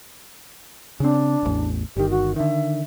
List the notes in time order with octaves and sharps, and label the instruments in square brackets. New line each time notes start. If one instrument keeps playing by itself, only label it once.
[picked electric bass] C#3 C4 [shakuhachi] D4
[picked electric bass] D#1 A1 E2
[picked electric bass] G1 D#3 [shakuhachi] G4
[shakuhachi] F#4
[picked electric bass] D3 D#3 [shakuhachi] E5